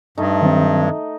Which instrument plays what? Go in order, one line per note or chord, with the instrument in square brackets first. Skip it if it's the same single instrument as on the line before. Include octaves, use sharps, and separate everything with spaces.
[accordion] G2 [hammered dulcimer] A3 D#4
[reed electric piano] D#3 F#3 C4